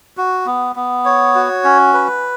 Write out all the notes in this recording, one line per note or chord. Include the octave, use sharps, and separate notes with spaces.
F#4
B3
B3
C#5
F#4
C#4
B4